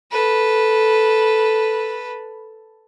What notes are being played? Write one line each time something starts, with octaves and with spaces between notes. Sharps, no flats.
A4 B4